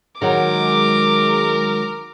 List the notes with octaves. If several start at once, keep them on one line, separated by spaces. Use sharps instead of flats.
D#3 F#3 G#3 A#4 D6